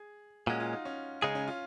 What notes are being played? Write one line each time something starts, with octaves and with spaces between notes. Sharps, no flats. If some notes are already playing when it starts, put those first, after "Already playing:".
Already playing: G#4
A#2 G#3 C#4 F#4
F4
D#4
C#4
C#3 G#3 C#4 D#4 G#4
C#4
F4